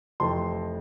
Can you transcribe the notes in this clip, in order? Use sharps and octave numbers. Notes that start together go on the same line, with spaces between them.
F1 F2 E3 A3 A5 C6